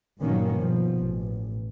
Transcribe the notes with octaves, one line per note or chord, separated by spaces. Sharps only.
G2 A#2 D#3 F#3 A#3 C#4
B2 F3
A1